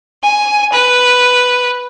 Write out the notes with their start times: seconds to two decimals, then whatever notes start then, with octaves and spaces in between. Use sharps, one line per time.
0.22 G#5
0.72 B4